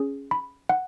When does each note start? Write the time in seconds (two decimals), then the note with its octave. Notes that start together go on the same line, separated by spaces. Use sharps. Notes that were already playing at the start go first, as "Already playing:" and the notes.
Already playing: C#4 G#4
0.31 B5
0.69 F#5